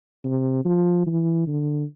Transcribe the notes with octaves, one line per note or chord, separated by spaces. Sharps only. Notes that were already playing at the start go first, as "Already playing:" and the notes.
C3
F3
E3
D3